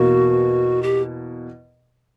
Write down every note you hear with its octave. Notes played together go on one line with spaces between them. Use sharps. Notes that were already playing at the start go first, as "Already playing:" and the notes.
Already playing: E2 B2 A#3 F#4
G4